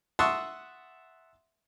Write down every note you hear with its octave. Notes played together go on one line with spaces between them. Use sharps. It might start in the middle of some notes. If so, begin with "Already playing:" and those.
E5 F#5 A5 C6 C#6 D#6